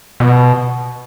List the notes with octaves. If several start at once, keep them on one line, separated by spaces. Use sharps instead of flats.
B2